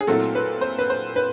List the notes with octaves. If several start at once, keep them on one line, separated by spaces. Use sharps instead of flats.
G#4
A#2 F#3 A3 C4 E4 A4
B4
C5
B4
C5
B4